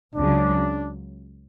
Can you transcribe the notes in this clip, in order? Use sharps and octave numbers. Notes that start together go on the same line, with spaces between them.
C#2 C#3 F#3 D4